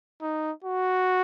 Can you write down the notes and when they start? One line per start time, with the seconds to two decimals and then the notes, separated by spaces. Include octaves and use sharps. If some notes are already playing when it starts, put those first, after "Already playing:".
0.21 D#4
0.64 F#4